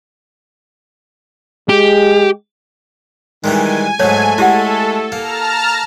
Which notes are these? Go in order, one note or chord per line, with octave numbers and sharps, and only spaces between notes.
G#3 G4
D#3 E3 G3 G#3 G#5
G#2 F#3 A3 C#5
G#3 E4 G4 A4 F#5
A#3 A5 A#5 F6